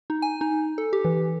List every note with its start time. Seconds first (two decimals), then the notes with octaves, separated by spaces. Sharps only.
0.10 D#4
0.22 G#5
0.41 D#4
0.78 A4
0.93 G4
1.05 E3